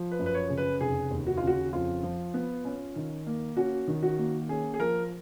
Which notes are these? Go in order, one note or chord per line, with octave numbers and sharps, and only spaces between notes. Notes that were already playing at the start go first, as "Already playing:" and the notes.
Already playing: F3
B4
F#2
B4
C#5
C#3
B4
F1 G#4
D#2
F#4
C#3 F4
F#4
F2 F4
F3
B3
C#4
D#3
A#3
C#4 F#4
D#3
F#4
A#3
C#4 G#4
G#4
F3 A#4